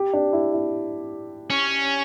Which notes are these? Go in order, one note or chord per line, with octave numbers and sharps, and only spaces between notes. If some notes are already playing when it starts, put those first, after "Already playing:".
Already playing: G4
D4
E4
E4
C#4